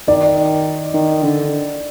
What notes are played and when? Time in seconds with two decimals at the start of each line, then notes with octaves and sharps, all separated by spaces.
0.08 D#3 D5
0.94 D#3
1.23 D3